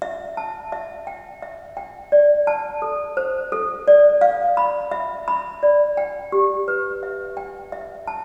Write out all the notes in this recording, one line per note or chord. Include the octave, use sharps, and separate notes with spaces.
E5
A5
E5
G5
E5
G5
D5
A5
A4
C5
A4
D5
F5
B5
E5
B5
D5
G5
G4
B4
E5
G5
E5
A5